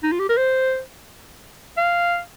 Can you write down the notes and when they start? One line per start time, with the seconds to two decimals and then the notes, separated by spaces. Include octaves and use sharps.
0.03 D#4
0.12 F4
0.20 G4
0.29 A#4
0.37 C5
1.77 F5